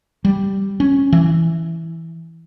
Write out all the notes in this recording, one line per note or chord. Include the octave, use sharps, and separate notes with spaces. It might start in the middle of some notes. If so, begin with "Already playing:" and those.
G3
C#4
E3